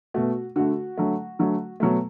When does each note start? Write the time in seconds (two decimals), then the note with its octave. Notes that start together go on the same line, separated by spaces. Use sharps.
0.14 B2 A3 F#4
0.56 D3 A3 F#4
0.97 D3 F#3 A3
1.39 D3 F#3 A3
1.80 B2 F#3 A3